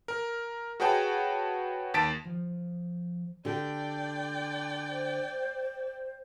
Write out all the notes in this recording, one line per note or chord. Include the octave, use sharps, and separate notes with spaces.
A#4
F#4 G#4 B4 C#5 G5 A5
D#2 A5 A6 B6 D7
F3
D3 G4 D5 G5
C5